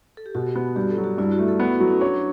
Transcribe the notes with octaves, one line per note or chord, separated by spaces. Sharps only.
A4
G4
B2 F#4
B3
G2 G4
A4
F#3
F#4
G2 E4
F#4
A3
A4
B3 B4
F#3
C#4
D4 C#5